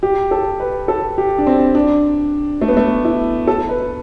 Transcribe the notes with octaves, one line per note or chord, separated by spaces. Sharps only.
G4
A4
B4
A4
G4
D4
C4
D4
A3
B3
A3
E4
A4
B4